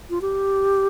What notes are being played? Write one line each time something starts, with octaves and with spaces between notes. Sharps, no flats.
F4
G4